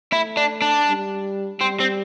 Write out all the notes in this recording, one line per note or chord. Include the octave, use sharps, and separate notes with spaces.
A3 E4
D4
D4
G3
G3 C4
C4